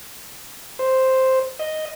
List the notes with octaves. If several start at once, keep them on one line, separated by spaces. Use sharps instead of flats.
C5
D#5